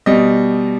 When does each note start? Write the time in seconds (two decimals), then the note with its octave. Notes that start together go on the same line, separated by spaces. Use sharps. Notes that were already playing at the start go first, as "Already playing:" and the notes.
0.06 B2 G3 D#5